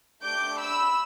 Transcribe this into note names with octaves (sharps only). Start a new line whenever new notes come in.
A3 D4 G4 D6 G6
B5 E6